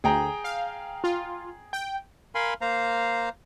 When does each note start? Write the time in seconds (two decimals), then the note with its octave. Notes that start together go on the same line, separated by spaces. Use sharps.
0.04 D2 G#4 G5 A#5
0.44 F5
1.04 F4
1.73 G5
2.35 A#4 F5 G#5 B5 C6
2.61 A#3 C5 F5 A#5